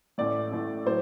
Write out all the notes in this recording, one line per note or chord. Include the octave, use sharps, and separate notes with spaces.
A1 A2 A3 D5
A1 A2 A3
A2 F#3 C5